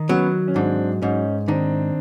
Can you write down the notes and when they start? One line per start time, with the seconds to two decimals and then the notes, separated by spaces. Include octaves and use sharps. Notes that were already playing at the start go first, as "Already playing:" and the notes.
Already playing: D#3
0.09 F#3 B3 C#4
0.48 C#4
0.55 G#2 C4 D4
1.02 G#2 C#4 D#4
1.48 D#3 C4 D4